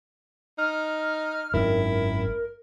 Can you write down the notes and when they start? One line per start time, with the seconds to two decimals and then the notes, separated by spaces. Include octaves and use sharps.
0.58 D#4 F6
1.54 G#1 F#2 D#3 E4 A#4